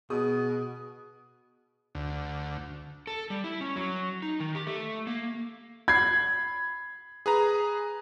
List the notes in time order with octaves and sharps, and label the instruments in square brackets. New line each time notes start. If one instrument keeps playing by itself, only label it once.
[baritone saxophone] B2 [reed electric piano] G#4 [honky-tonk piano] D#6
[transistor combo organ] D2
[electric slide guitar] A4
G3
E4
C#4
F#3
D#4
D#3
G4
A3
A#3
[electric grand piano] B5 C7 [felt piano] G#6
[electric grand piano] G#4 B4 A#5